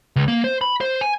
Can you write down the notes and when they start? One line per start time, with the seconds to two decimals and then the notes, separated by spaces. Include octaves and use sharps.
0.16 C#2
0.28 A#3
0.44 C5
0.61 B5
0.81 C5
1.01 G#5